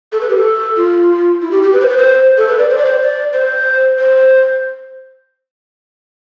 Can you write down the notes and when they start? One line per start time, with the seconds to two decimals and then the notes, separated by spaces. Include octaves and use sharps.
0.12 A4
0.21 B4
0.29 G4
0.37 A4
0.77 F4
1.42 E4
1.51 G4
1.63 G4
1.73 B4
1.81 C5
1.89 B4
1.97 C5
2.37 A4
2.48 B4
2.59 D5
2.69 C5
2.78 D5
2.85 C5
3.02 D5
3.33 C5
3.98 C5